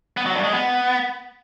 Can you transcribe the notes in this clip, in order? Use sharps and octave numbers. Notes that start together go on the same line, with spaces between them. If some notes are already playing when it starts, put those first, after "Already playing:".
B3
F#3
G2
G#3
B3